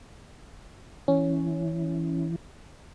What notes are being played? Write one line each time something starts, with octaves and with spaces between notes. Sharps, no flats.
E3 C#4